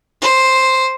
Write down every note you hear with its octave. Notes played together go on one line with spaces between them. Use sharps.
C5